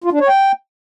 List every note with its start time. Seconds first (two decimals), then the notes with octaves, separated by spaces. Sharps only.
0.04 F4
0.12 D4
0.20 C#5
0.29 G5